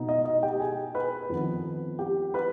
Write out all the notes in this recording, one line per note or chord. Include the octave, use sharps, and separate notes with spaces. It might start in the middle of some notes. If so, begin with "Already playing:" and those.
Already playing: B2 B3 D#4
D#5
D#5
G4 G5
G#4 G#5
B4 B5
F2 D#3 B3
G4 G5
B4 B5